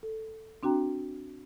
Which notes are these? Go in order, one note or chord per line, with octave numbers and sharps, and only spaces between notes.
A4
C4 D4 F#4 G5 A#5